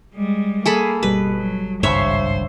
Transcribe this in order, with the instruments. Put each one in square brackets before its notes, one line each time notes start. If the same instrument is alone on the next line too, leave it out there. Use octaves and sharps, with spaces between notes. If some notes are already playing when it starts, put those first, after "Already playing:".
[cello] G3 G#3
[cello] A#3 [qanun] G#4 A4 B5
[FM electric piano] G1 G3 [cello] B2 [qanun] B4
[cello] F#3
[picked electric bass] G#1 C#2 G2 [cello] C5 [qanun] C#5 E5